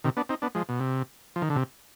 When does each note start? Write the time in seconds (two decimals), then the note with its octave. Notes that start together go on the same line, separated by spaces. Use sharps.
0.04 C3 D#3
0.17 B3 D4
0.29 C4 D#4
0.42 B3 D4
0.55 F3 G#3
0.69 B2
0.80 C3
1.36 F3
1.42 D#3
1.50 D3
1.56 C3